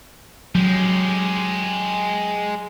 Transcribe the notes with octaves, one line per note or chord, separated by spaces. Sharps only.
F#3 G#3 G4